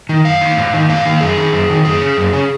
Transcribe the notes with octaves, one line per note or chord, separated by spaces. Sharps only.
D#3
F#2 F5
D#3
G#2
D#3
G#2 F5
D#3
F#2 G#4
D#3
F#2
D#3
F#2 G#4
C#3
F#2
C#3